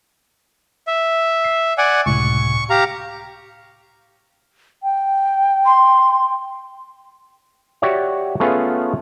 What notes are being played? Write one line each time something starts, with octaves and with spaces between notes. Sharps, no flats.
E5
C7
D5 F#5 G#5
C#2 A2 C3 C#6
G4 F5 A#5
G5
C6
F#4 G4 C#5 D5 E5
A3 B3 C#4 F4 G#4 A4